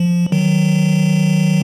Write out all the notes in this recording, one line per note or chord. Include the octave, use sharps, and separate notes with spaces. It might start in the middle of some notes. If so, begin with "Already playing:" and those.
Already playing: F3
D#3 F#3